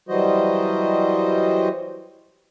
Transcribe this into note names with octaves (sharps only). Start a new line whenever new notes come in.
E3 F#3 G3 F#4 C5 D#5